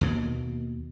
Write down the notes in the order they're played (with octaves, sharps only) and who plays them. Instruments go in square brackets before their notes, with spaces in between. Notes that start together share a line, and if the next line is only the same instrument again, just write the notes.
[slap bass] D#2 B2 A#3